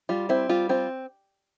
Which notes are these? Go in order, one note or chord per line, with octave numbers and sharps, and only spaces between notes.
G3 F4
C4 E4
G3 F4
C4 F4